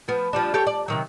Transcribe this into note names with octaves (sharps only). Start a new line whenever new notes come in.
F3 B3
F3 G3 D4
G4 A4 C#5
D5
C3 D#3 F#3